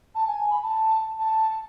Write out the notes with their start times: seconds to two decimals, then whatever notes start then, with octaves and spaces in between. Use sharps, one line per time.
0.15 A5
0.27 G#5
0.50 B5
0.63 A5
1.19 A5